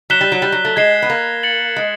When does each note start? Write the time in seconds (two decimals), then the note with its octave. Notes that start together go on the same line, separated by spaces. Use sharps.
0.10 F#3 F#6 B6 E7 G7
0.21 G3
0.32 F#3
0.42 G3
0.52 F#3
0.65 A3
0.76 G#3 G#6 C7 E7 G7
1.02 B3
1.10 A#3
1.43 A6 C#7 F#7
1.76 G#3